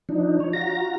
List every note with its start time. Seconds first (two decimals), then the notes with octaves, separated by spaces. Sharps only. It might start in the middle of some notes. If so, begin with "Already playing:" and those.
0.09 F3 D4 D#4
0.40 C#5
0.53 F4 F#4 A#5 A#6